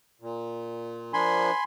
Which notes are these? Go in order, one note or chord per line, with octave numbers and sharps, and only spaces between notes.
A#2
F3 A#3 D4 G#5 B5 C6